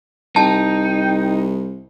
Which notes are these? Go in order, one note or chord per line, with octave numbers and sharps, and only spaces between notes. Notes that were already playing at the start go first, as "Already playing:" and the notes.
C2 D#4 G5 A5